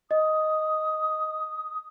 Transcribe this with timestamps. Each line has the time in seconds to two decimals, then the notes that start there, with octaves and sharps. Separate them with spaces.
0.11 D#5 D#6